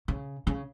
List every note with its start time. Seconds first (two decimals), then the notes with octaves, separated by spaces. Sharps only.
0.08 C#3
0.47 C#3